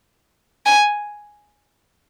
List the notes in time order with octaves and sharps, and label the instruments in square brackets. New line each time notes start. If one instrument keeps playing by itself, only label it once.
[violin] G#5